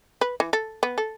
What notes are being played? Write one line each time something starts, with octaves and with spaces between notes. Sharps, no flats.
B4
E3
A4
B3
A4